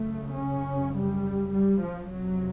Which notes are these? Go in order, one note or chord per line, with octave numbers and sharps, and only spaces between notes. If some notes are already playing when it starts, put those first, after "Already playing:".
Already playing: F#2 C#3 A3
C#4
G3
G3
F3
F2 C3 F#3